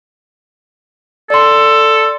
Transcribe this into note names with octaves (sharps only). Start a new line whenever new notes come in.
A4 D5 C6